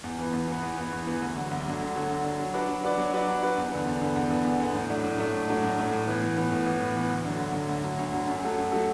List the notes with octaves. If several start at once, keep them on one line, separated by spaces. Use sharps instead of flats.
E2
E3 B3
E2
E3 B3
E2
E3 B3
E2
E3 B3
D2
D3 F#3
D2
D3 F#3
D2
D3 F#3
D2
D3 F#3
F#3
D4 F#4 B4 D5
F#3
D4 F#4 B4 D5
F#3
D4 F#4 B4 D5
F#3
D4 F#4 B4 D5
E2
D3 B3
E2
D3 B3
E2
D3 B3
E2
D3 B3
A2
F#3 A3 D4
A2
F#3 A3 D4
A2
F#3 A3 D4
A2
F#3 A3 D4
A2
E3 B3
A2
E3 B3
A2
E3 B3
A2
E3 B3
D2
D3 F#3
D2
D3 F#3
D2
D3 F#3
D2
D3 F#3
F#2
F#3 A3 F#4 A4
F#2
F#3 A3 F#4 A4